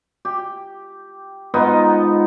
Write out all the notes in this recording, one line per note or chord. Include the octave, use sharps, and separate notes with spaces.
G4
G#2 B3 D#4 F4